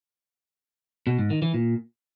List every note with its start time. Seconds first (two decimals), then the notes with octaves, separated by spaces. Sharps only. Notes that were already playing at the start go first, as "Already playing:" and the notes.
1.07 B2
1.18 G#2
1.30 D#3
1.42 E3
1.54 A#2